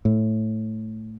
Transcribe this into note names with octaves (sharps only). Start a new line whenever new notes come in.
A2